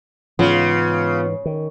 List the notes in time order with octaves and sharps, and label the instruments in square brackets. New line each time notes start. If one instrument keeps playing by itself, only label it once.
[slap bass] G#2 E3 [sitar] C#3 [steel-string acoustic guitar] B3 F4
[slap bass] D#3